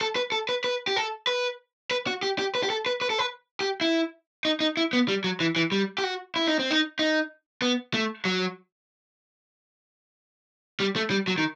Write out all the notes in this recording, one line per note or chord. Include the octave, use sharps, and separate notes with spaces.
A4
B4
A4
B4
B4
G4
A4
B4
B4
F#4
G4
G4
B4
G4
A4
B4
B4
A4
B4
G4
E4
D#4
D#4
E4
B3
G3
F#3
E3
E3
G3
G4
F#4
E4
D#4
C4
D#4
D#4
B3
A3
F#3
G3
A3
G3
F#3
D#3